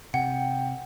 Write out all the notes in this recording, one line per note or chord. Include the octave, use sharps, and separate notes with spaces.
C3 F#5 G5